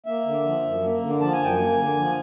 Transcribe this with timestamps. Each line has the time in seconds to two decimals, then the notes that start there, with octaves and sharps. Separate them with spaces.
0.06 A#3 E5
0.26 D3
0.45 F3
0.63 F#2
0.83 A#3
1.02 D3
1.20 F3 A5
1.33 G#5
1.40 F#2 G5
1.55 A#3 G#5
1.78 D3
1.97 F3